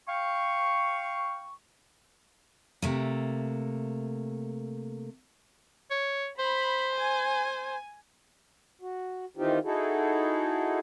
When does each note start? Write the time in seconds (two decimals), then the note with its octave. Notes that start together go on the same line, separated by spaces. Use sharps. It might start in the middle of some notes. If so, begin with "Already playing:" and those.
0.08 F5 G5 C#6
2.82 C3 A3 A#3
5.91 C#5
6.39 C5 B5
6.96 G#5
8.81 F#4
9.37 D#3 E3 C4 D#4 F4 G4
9.64 D#4 E4 F#4 G#4 A4